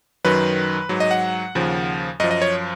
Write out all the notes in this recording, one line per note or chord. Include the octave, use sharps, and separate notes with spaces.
F#2 D#3 F#3 B4
G#2 F#3
D#5
F#5
D#2 C#3 F3
F#2 F3 D#5
D#5
C#5